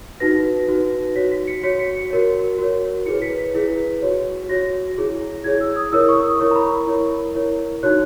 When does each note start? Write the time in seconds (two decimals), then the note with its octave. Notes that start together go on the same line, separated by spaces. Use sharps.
0.20 D#4 F#4 B4 A#6
0.68 D#4 F#4 B4
1.16 F#4 C#5 B6
1.32 B6
1.48 C#7
1.63 F#4 C#5 B6
1.79 C#7
2.11 F#4 A#4 C#5
2.58 F#4 A#4 C#5
3.06 E4 G#4 B4 C#7
3.22 B6
3.38 B6
3.54 E4 G#4 B4
4.02 F#4 C#5
4.49 F#4 C#5 A#6
4.97 E4 G#4 C#5
5.44 E4 G#4 C#5 G#6
5.61 E6
5.76 D#6
5.92 E4 A#4 C#5 E6
6.00 D#6
6.08 C#6
6.17 D#6
6.40 E4 A#4 C#5 C#6
6.51 A#5
6.55 B5
6.71 C#6
6.87 E4 A#4 C#5
7.35 E4 A#4 C#5
7.83 D#4 F#4 C#5 F#6